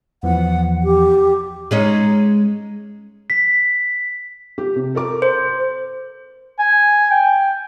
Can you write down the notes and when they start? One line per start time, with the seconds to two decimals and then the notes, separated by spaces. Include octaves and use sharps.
0.23 E2 E3 F3 F#5
0.83 G4
1.71 G#3 C#4 D#4
3.30 B6
4.58 G4
4.76 C3
4.95 A4 A#4 D6
5.22 C5
6.59 G#5
7.11 G5